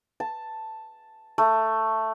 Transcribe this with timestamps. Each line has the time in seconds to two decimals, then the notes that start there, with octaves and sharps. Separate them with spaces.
0.20 A5
1.38 A3